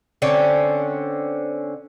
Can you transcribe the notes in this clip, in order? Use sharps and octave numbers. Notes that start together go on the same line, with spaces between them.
D3 C4 C#4